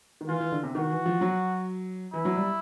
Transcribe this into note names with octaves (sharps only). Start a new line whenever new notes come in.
D#3
E3 F4
E3
D3
C3
D#3 F#4
E3
F3
F#3
E3 E4
F#3
G3